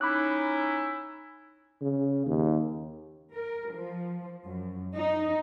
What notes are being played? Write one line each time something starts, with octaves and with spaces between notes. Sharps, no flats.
C#4 D#4 E4 B5 D6 F#6
C#3
D#2
A#4
F3
F#2
D#4